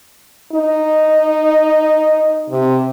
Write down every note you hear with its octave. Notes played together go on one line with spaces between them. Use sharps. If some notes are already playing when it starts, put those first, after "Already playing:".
D#4
C3